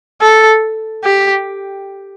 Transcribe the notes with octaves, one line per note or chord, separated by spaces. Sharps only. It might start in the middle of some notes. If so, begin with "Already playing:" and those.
A4
G4